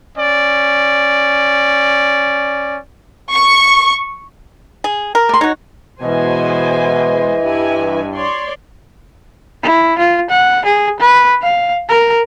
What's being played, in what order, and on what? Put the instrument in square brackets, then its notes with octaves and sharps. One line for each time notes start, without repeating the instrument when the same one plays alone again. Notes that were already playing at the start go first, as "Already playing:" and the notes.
[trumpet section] C#4 D5
[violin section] C#6
[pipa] G#4
A#4
[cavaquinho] D5 C6
[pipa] D#4 F#4 [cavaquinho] C#5
[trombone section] B2 [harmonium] E3 [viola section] G#3 C5 G#5 [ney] D#5
[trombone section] G2 [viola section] E4 G4 G#5
[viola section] C#5 D5 C6
[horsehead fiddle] E4
F4
F#5
G#4
B4
F5
A#4